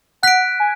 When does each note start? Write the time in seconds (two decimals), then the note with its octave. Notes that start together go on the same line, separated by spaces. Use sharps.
0.23 F#5 F#6 B6 D7
0.60 G#5